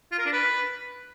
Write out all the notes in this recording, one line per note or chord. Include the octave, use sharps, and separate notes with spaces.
F4
A#4
D4
B4